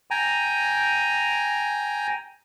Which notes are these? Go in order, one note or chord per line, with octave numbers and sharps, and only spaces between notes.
G5 G#5 A#5